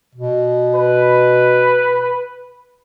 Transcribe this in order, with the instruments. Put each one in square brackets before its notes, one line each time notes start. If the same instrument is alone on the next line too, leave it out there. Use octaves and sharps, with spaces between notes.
[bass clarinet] B2
[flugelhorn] B4